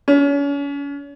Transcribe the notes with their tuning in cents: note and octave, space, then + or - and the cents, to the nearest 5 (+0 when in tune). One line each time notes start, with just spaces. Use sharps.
C#4 +35